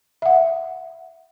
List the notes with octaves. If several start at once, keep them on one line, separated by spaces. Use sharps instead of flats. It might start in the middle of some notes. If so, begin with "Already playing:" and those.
E5 F#5